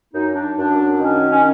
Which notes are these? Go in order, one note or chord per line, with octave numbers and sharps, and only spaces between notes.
F#2 D#4
D4
F#2 D4
D#3 C#4
C#4